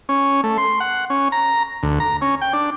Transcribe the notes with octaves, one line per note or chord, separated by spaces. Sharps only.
C#4
A3
C6
F#5
C#4
A#5
D2
A#5
C#4
G5
D4